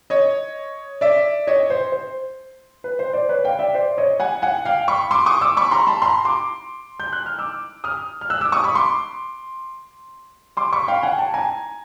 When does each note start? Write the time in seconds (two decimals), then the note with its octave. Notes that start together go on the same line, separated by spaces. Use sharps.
0.10 C#5 D#5
1.01 D5 E5
1.47 C#5 D#5
1.70 C5
1.92 C5
2.84 B4
2.99 C5
3.13 C5 D5
3.29 B4 C#5
3.44 F5 G5
3.59 D5 E5
3.74 C5 D5
3.98 C#5 D#5
4.20 F#5 G#5
4.42 F#5 G#5
4.65 F5 G5
4.88 B5 C#6
5.11 C6 D6
5.26 C#6 D#6
5.41 D6 E6
5.57 B5 C#6
5.71 A#5 C6
5.87 A5 B5
6.02 A#5 C6
6.25 C6 D6
7.00 G6
7.13 F#6
7.26 F6
7.39 D6 E6
7.84 D#6 F6
8.21 F6
8.30 E6 F#6
8.41 D6 E6
8.52 C#6 D#6
8.64 B5 C#6
8.75 C6 D6
10.57 C6 D6
10.72 B5 C#6
10.88 F5 G5
11.03 F#5 G#5
11.18 G5 A5
11.34 G#5 A#5